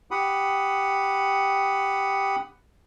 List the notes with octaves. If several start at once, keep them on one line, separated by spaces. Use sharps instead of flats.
G4 F#5 B5 D#6